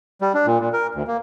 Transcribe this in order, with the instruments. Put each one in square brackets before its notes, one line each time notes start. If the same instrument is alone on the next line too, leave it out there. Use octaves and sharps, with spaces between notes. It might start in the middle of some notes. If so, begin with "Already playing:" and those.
[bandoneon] G3
D4
A#2
A#2
A#4
D2
A#3